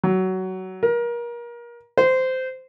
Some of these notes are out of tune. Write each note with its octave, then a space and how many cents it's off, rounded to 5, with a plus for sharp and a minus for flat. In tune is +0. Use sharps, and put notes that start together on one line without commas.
F#3 +20
A#4 +30
C5 -15